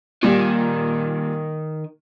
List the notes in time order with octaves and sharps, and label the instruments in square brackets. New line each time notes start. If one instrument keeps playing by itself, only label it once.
[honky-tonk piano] A#2 G3 [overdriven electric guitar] D#3